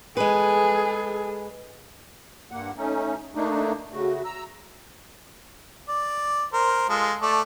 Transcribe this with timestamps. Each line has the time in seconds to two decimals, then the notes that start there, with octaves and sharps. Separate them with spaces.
0.17 G#3 G#4 A4 B4
2.51 G2 A#3 F#5
2.77 A3 C#4 D#4
3.35 A3 A#3 D4 D#4
3.93 C#3 A3 F#4
4.25 A#5 E6
5.89 D5
6.53 A#4 C5
6.89 G#3 F4 A4
7.22 A3 D5